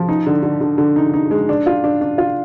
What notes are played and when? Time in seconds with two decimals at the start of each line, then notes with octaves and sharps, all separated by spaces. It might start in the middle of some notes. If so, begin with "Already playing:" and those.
Already playing: F3
0.09 D#4
0.26 D3
0.43 D3
0.61 D3
0.78 D3
0.96 D#4
1.14 D#4
1.31 G#3
1.49 D4
1.66 F4
1.84 D4
2.01 D4
2.18 F4